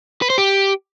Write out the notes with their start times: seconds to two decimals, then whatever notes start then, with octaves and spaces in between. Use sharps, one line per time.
0.22 B4
0.30 C5
0.38 G4